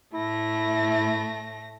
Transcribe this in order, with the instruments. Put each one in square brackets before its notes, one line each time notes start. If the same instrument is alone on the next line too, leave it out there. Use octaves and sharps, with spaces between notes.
[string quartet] A2 A3 A#6 [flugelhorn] E4